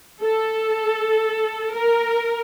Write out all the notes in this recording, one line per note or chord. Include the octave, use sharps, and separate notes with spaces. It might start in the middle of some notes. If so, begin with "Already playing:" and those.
A4
A#4